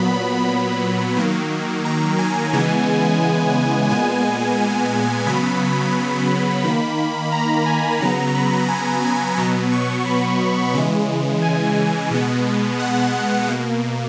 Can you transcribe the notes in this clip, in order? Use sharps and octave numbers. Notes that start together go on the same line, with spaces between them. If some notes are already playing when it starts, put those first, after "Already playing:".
Already playing: A#2 F#3 B3 B5
B5
B5
D#3 F#3 A#3
A#5
G#5
C#3 E3 G#3 B3
A#2 G#3 B3 G#5
C#3 F#3 B3 B5
D#3 A#3 B5
A#5
G#5
C#3 F#3 B3 A#5
B5
G#5
G#5
B2 F#3 B3 A#5
C#6
B5
C#3 E3 G#3
G#5
B2 G#3 B3
F#5
B2 A#3